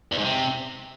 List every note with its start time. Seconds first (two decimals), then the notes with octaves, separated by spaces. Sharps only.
0.12 E2
0.18 G#2
0.25 C3